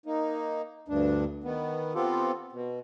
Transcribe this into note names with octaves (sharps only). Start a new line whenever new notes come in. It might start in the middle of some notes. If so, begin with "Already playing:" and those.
A#3 D#4
D2 G2 D4
D#3 B3
B3 C4 F4 G4 A4
B2